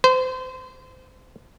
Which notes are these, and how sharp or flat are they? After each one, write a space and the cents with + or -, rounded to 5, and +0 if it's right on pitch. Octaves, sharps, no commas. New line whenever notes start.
C5 -30